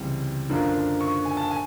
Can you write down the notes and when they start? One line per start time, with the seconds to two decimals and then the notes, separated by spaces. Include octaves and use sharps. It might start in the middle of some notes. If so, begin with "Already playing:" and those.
Already playing: C#2 C3 E3 G3
0.50 F#2 D3 F3 A#3 D4
1.01 C#6
1.25 G#5
1.37 A5
1.51 G#5